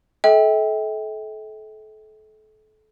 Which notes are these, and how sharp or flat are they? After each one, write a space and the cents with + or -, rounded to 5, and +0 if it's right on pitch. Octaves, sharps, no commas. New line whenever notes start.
A4 -30 E5 -45 G5 +10